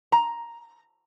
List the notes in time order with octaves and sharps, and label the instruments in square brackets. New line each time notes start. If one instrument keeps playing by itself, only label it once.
[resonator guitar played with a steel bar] A#5